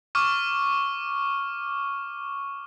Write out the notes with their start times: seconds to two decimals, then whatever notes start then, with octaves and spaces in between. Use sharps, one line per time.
0.15 C#6 D6 F6